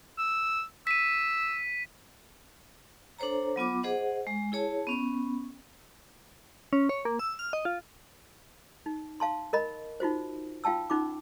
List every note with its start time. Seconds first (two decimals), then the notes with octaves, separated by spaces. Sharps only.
0.18 E6
0.87 E6 B6 D#7
3.19 D4 A4 C5 C#5 A#5
3.56 F#3 B3 F4 D6
3.83 G#4 C5 D#5 F#5
4.27 G#3
4.52 E4 G#4 C#5 A5
4.87 B3 C#4 C#6
6.73 C#4
6.89 C#5
7.05 A#3
7.19 E6
7.39 F6
7.53 D#5
7.65 F4
8.86 D#4
9.20 F5 A5 C6
9.53 A#4 D#5 B5
10.00 D#4 F4 F#4 C5
10.64 F4 F5 G5 A5 E6
10.90 C#4 D#4 F4 D6